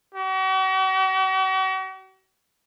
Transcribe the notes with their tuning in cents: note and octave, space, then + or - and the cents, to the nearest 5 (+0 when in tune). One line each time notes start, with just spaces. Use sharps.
F#4 +45